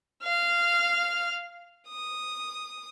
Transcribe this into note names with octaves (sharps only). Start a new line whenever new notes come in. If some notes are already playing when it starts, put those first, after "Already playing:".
F5 F6
D#6